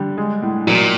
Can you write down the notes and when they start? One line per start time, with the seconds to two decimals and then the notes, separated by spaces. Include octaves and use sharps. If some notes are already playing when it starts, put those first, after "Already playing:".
Already playing: D3 G3
0.18 G#3
0.42 A2
0.67 A#2 F#3